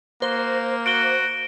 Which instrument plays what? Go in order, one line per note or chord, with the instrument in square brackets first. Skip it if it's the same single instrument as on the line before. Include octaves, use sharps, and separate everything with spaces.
[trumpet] A#3 [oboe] F#4 [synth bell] C5
[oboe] F#4 [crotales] D7 G7